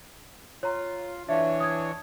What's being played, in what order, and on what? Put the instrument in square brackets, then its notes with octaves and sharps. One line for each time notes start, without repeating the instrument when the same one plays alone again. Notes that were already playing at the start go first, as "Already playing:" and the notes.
[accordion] F4 [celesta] C#5 A#5
[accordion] E3 D4 C#5 [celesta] E5 F5
[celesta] D#6 G#6